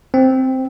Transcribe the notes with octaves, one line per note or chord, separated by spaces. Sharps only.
C4